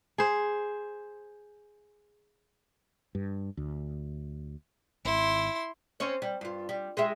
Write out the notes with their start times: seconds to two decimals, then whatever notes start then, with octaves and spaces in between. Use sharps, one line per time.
0.18 G#4 C5
3.15 G2
3.57 D2
5.05 G#1 E4 C6
6.00 C4 C#4 C#5
6.22 G3
6.41 G2 F4
6.69 G3
6.97 G#3 G4 E5